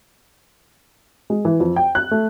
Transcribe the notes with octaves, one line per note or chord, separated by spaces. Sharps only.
G#3
E3
F2
G5
F#6
A3